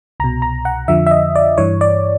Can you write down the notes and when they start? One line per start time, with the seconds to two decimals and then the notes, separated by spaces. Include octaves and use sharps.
0.20 C2 B2 A#5
0.42 A#5
0.65 F#5
0.88 F2 D3 F3 E5
1.06 E5
1.11 D#5
1.35 D5
1.58 G2 E3 C#5
1.81 D5